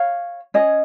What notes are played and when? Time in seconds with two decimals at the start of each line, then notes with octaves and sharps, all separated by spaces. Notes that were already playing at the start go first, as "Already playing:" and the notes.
Already playing: C#5 F5
0.54 C#4 G#4 D#5